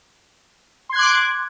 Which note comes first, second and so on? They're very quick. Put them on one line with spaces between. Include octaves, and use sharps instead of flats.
C6 G#6 F#6 D6